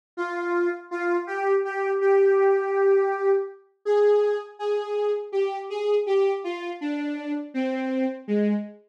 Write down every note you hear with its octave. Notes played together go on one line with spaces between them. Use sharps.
F4
F4
G4
G4
G4
G#4
G#4
G4
G#4
G4
F4
D4
C4
G#3